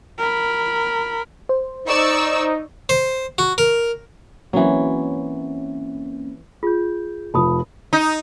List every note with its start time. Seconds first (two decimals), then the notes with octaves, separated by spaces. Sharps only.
0.19 A#4 B5
1.49 C5
1.88 D#4 D5 C#6 E6
2.89 C5
3.38 F#4
3.58 A#4
4.53 E3 F#3 A#3 C4 C#4
6.63 F4 G#4 G6
7.34 F1 F3 A5 B5 D#6
7.93 D#4